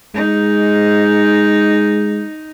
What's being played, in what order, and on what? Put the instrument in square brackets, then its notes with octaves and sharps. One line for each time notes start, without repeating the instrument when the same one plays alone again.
[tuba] G#3 [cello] D#4